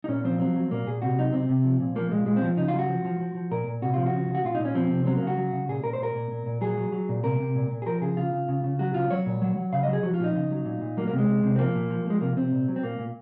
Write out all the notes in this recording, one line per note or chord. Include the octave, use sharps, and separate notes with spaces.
D#4
A#2 C#4
F3 C4
F#3 C4
F#3
A#2 A#3
A#2 G#4
C3 F#4
F#3 D#4
C3 C4
C3
F3
A#2
F3 A#3
A#2 G#3
A#2 G#3
C4
F3
C#3 D#4
F4
F#3 F#4
F3
F3
F3
F3
A#2 A#4
A#2
C3 F#4
F3 F4
F#4
C#3
C#3
F#4
A#2 F4
A#2 D#4
C#4
F3 C4
C3
F#3 C4
A#3
C#3
F#4
F#3
C#3
A#2 G#4
A#2 A#4
C5
A#2 A#4
A#2
A#2
A#2
F#3 G#4
F#3
F#3
A#2
C3 A#4
C3
A#2
A#2
G#4
F3 A#4
C#3 G#4
C#3 F4
C#3
C#3
C#3
F#3 F#4
C#3 F4
F#3 C#5
A#2
F#3
F#3
C#3 F5
F#3 D#5
G#4
F3 F#4
F4
A#2 D#4
C#3
F#3
A#2
A#2
F#3 A#3
A#3
C3
G#3
C3
C3
C4
F3 A#3
A#2
F3
F3 G#3
C3 A#3
C3 C4
A#2
F#3
C4
A#2 A#3
A#2